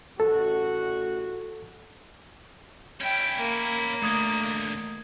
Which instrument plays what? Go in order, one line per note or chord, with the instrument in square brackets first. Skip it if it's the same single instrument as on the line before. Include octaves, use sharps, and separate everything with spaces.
[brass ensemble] A1 F#4 [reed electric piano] A4
[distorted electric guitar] C#4 E4 [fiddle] G5
[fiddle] A#3
[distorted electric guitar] E2 D3 [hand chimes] A3 D#6 G#6